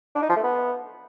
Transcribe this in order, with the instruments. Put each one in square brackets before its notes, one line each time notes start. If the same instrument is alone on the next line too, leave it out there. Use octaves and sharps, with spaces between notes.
[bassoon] D4
D#4
F3
A3
B3